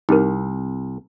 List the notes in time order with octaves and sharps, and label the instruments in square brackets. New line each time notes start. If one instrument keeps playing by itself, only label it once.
[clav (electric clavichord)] C2 [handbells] D#4 G4 A#4